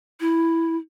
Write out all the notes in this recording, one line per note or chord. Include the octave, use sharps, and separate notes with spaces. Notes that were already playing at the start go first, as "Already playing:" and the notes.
E4